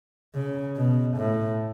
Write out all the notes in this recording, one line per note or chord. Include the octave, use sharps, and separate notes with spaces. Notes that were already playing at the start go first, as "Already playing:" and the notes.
C#3
B2
A2